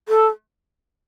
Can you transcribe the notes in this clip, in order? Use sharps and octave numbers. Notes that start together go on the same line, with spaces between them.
A4